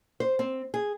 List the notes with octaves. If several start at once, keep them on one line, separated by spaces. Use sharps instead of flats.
C5
C4
G#4